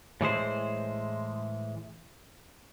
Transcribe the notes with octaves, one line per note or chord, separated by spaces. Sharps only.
A2 E3 G#3 C5